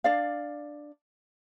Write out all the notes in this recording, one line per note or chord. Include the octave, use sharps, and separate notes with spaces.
D4 D5 F5